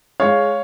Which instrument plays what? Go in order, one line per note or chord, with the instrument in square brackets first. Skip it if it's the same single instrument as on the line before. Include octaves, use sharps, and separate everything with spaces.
[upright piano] G#3 C#5 F5